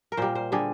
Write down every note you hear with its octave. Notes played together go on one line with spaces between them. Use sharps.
A#4
A#2 G3 C5
C5
D3 G3 G#4